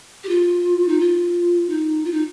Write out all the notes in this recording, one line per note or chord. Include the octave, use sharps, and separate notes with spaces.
G4
F4
D#4
F4
D#4
F4
D#4